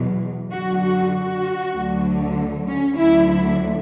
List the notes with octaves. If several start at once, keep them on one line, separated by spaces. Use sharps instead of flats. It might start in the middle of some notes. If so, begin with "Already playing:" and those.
Already playing: E2 B2 F#3
F#2 D3 F#3 F#4
F#4
F#4
D2 D3 F#3
C#4
D2 D3 F#3 E4
E4